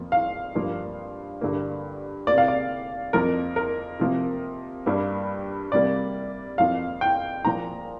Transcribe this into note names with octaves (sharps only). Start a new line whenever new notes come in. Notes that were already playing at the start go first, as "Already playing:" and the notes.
Already playing: F2 F3 A#3
F5
G2 F3 A#3
G2 D3 A#3
C3 A#3 D5
F5
D5
F2 F3 A#3 A#4
A#4
C3 F3 A#3
G2 G3 A#3
C3 G3 A#3 D5
F2 F3 A#3 F5
G5
A#2 F3 A#3 A#5